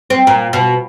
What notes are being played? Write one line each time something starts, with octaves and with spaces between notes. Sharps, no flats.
C4
A#2
B2